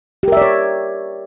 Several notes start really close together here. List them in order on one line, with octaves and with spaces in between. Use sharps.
G4 A#4 E5 D5 C#5